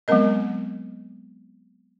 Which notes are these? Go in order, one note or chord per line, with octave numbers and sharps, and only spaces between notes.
F#3 G#3 B3 C4 A#4 D#5